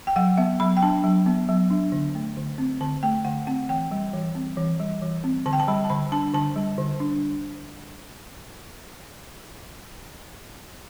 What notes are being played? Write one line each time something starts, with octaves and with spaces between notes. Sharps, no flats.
G5
F#3 F#5
B3 E5
F#3 B5
G5
D4 A5
F#3
B3
F#3
D4
D3
A3
D3
C4
D3 A5
A3 G5
D3 F#5
C4 F#5
E3 G5
G3
E3
C4
E3
G3
E3
C4
D3 A5
G5
A5
G3 B5
A5
D3 B5
D4 A5
D3 A5
G3
D3
D4